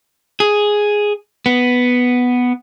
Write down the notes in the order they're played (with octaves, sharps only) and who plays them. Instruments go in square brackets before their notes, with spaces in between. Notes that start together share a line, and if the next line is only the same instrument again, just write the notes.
[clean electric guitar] G#4
B3